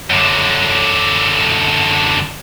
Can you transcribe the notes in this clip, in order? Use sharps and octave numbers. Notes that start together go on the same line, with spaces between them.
F#2 D3